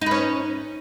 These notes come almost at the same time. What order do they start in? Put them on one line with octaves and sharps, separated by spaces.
D#4 B4 C#4